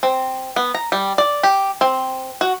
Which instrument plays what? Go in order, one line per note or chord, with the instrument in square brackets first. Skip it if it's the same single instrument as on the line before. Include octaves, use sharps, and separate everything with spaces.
[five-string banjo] C4
B3
A#5
G3
D5
G4
C4
F#4